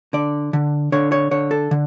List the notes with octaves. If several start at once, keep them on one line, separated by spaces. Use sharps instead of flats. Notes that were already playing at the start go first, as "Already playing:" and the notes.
D3 D5
D3
D3 C#5
C#5
D3 C#5
A4
D3